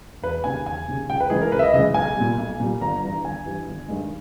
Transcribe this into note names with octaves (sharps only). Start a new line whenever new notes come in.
E1 B4
D#2 C#3 G#5
E1 G#5
D#2 C#3
C#2 G5
B4
C#3 E3 G#3 G#4
A#4
C#2 B4
E5
D#5
C#3 E3 G#3 D#5
B1 G#5
A#2 G3
B1
A#2 G3
G1 A#5
G2 E3 G3
G1 G#5
G2 E3 G3
G1
G2 D#3 G#3